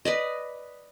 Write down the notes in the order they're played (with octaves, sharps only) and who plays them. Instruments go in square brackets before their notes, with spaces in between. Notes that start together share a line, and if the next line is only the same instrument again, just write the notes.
[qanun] B4 D5 D#5